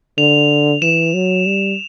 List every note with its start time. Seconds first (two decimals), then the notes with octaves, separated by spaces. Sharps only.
0.18 D3 F7
0.82 E3 E7
1.14 F#3
1.46 G3